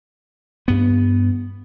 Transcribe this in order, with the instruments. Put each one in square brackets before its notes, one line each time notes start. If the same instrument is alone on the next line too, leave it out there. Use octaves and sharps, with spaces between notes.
[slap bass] G2 B3